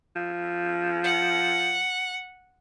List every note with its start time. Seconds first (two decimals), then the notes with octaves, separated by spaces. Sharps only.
0.16 F3
1.04 F#5